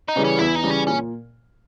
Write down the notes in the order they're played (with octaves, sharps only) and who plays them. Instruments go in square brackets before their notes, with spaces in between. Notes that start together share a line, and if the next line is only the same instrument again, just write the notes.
[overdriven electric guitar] D#4
[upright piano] C#3 E3 G3
[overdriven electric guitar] C#4
[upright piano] E2 [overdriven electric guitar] E4
[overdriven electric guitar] D#4
[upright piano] C#3 E3 G3
[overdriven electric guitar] C#4
[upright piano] A#2 [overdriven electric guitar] C#4